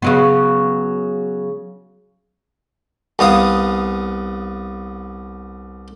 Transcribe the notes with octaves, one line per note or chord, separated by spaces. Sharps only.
C#3 F#3 B3
C2 B3 F5 D#6